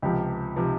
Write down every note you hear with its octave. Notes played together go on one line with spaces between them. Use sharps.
C#2 C3 F3 G4
C3 F3